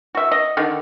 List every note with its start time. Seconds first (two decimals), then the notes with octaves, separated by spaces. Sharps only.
0.15 F#4 E5
0.32 D#5
0.57 D3 D#3